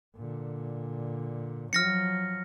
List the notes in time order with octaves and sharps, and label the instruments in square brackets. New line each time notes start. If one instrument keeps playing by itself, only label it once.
[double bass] A#2 D3
[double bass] F3 F#3 [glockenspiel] F6 A#6 C#7